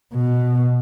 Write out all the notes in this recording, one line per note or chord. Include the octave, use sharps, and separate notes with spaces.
B2